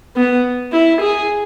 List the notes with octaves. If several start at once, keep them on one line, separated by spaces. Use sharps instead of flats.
B3
E4
G#4